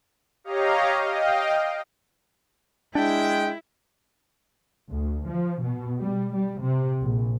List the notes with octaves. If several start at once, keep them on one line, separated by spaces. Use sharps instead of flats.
G4 C#5 D#5 F5 A#5
D#5 F5 G5
G#3 D4 E4 G5
D2
F3
B2
G3
G3
C3
A#1